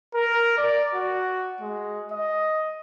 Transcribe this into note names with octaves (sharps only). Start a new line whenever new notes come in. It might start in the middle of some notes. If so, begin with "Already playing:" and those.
A#4
D5
F#4
G#3
D#5